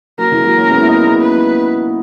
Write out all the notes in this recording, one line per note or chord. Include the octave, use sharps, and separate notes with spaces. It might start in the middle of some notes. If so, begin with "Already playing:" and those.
F#3 A#3 A#4
E3 G#3
F#3 A#3
A#3 C#4
G#3 B3
E4
B3 D#4
G#3 B3
B4